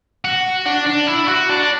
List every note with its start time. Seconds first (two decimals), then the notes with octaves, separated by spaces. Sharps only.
0.25 F#4
0.66 D4
0.87 D4
1.07 E4
1.28 F#4
1.50 D4